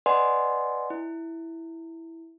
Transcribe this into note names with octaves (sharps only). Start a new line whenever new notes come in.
B4 D5 D#5 F#5 G#5 C6
E4